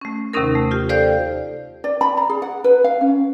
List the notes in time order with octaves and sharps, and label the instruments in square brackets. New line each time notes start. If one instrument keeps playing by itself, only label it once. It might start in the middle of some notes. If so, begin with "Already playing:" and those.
[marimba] A3 C#4
D#2 C3 D#3 C#4 D#4 A#4
A3
F4 G4
A4 C5 D5 F5 G5 G6
[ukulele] D5
B5
A#5
G#4
F#5
B4
F5
C#4